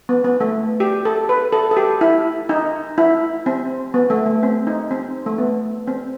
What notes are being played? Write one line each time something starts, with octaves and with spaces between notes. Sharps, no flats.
B3
B3
A3
G4
A4
B4
A4
A4
G4
E4
D#4
E4
C4
B3
A3
A3
C4
D#4
C4
A3
B3
C4